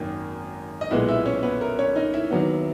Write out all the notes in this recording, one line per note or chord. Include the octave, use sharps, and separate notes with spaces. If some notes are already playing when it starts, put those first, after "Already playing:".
Already playing: G#1 F#2 D#3 A#3
D#5
B1 A#2 G#3 B3 E4 E5
E4 E5
C#4 C#5
B3 B4
A#4
C#4 C#5
D#4 D#5
E4 E5
D#2 D#3 F#3 B3